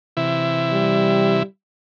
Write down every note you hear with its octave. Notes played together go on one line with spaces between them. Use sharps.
C3 E3 E4
G3